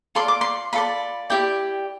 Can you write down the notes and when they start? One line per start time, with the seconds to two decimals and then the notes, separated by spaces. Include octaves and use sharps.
0.15 F4 A4 D5 C6
0.28 D6
0.41 C6
0.73 F4 A4 D5 B5
1.30 E4 G4 D5 G5